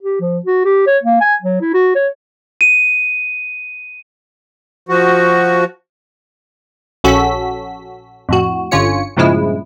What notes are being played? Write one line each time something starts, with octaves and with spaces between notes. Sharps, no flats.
G4
F3
F#4
G4
C#5
A#3
G#5
F#3
E4
F#4
C#5
D#7
F3 F#4
A#1 C#4 F#4 A4 B6
F2 A2 F#4
G1 D3 C#4 F4 C#5 C#7
G2 A#2 C#3 F3 G#3 E4